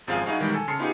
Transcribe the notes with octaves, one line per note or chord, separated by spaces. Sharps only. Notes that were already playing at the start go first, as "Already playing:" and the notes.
G#1 F#2 F3 C4 G#4 F5
F#3 D#4 E4 F#4 G#4 F5
B2 D#3 E3 G3 G#3
A4 G#5
C#3 A5 C6 C7 C#7
B3 D#4 F4 G4 G#4